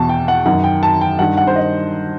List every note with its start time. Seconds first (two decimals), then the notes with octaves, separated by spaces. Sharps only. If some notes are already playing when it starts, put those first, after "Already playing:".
Already playing: E2 B2 A5
0.09 G5
0.28 F#5
0.46 F#2 D#3 F#5
0.64 G5
0.83 A5
1.01 G5
1.19 G2 D#3 F#5
1.37 F#5
1.47 C5
1.56 D#5